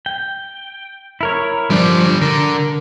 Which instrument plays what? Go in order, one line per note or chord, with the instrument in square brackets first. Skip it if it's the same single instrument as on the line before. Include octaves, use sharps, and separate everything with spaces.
[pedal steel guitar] G5
E4 A#4 C#5
[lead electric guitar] D3 G3 [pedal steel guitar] F3 D4
[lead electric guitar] D3 [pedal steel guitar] A#4